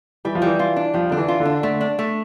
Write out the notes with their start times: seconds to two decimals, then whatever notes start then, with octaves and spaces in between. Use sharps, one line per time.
0.25 E3 G3
0.35 F3
0.42 E3 G3
0.59 F4
0.76 D4
0.94 F3 G3
1.10 D3 D4
1.18 E3
1.28 F4
1.40 D3
1.45 D4
1.63 D3 A3
1.81 D4
1.99 A3